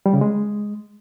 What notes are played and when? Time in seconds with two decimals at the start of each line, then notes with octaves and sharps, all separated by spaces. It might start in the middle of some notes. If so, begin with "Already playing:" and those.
0.06 G3
0.13 C#3
0.21 G#3